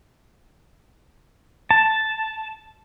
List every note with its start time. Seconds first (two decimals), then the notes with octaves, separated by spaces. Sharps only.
1.71 A5